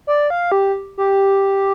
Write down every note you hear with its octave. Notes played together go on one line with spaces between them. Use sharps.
D5
F5
G4
G4